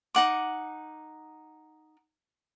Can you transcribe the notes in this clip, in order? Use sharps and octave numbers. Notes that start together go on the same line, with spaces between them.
D#4 F#5 D6